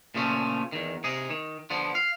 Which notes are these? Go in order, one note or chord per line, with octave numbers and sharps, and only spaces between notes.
A#2 C#3 F3 A3 C#4
E2 D#3
C3 D#4 G#4
D#3
D3 F3 B3
F5